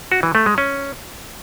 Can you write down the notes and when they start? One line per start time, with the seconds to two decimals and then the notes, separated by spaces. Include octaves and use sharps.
0.12 F#4
0.23 E3
0.35 A3
0.46 G#3
0.58 C#4